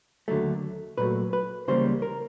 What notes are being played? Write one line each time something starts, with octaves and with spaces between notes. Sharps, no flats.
D#2 D3 F#3 A3
A#2 F#3 A3 B4
B4
C#2 C#3 E3 G3 A#3 C5
A#4